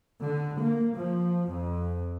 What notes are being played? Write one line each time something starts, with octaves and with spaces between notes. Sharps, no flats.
D3
A#3
F3
F2